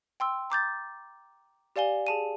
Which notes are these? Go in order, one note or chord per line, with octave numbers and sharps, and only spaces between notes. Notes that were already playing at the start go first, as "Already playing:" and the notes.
G5 C6 E6
A#5 D6 G6 A6
G4 D5 F5 G#5 G7
G#4 A5 D#7